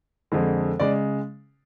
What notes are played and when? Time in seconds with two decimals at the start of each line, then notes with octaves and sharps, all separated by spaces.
0.32 F2 D3 G#3
0.80 C#3 G#3 D5